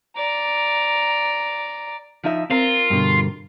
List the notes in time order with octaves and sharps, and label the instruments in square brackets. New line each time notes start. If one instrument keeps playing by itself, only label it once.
[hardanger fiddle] D5 A#5
[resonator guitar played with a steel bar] F3 D#4 E5
[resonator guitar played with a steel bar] C4 A#4 [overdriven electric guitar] F4
[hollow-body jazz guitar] G2 B2 D3